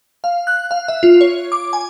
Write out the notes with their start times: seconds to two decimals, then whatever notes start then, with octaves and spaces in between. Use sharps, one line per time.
0.24 F5
0.47 F#6
0.71 F5
0.88 E5
1.03 F4
1.21 C#5
1.52 D6
1.73 G#5